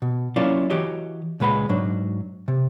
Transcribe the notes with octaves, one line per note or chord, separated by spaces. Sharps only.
B2
F#3 A#3 C#4 E4 F4 D5
E3 F#4 G4 C#5 D#5
C#2 A#2 G#3 B4 F#5 B5
G#2 F#3 D4
C3